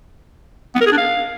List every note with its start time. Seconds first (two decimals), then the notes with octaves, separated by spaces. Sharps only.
0.75 B3
0.81 A#4
0.86 G#4
0.92 D4
0.98 F5